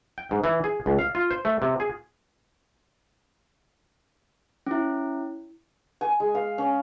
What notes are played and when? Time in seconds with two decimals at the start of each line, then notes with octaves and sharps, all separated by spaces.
0.18 G5
0.31 G#2
0.44 E3
0.64 G#4
0.86 C#2
0.99 F5
1.15 F4
1.31 C5
1.45 A3
1.62 C3
1.80 G#4
4.67 C#4 E4
6.01 G#5
6.20 G#3
6.35 F5
6.58 C#4